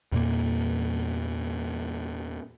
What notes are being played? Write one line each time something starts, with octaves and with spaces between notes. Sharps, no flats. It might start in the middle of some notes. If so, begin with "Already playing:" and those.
E2 A#2 A#3